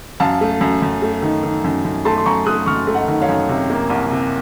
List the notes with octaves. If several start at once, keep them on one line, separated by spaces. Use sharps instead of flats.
F#2 F5 A5
A3
F#2
F#2
A3
D#3
D#3
F#2
F#2
A3 A5 C6
C6
F#2 A#5 C#6
A3 D#6 F#6
F#2 C#6 F6
A3
D#5 F#5
D#3
C#5 F5
F#2
C3
A#3
C2
C3